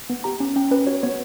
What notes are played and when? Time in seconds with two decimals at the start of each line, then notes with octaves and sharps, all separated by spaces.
0.10 B3
0.24 G4 A#5
0.40 C#4
0.56 C#4 G5
0.71 C#4 B4
0.87 F#4 C#5
1.03 B3 C#5